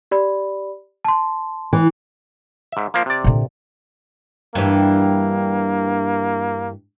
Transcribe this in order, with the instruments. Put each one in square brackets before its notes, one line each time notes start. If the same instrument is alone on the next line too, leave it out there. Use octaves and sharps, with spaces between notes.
[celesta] G4 D5 B5
A5 C6
[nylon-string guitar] E3
[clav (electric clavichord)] G#2 E5
F3 A#3
C3 D5
[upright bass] A#2 D3
[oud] G2 E3 [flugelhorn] A#3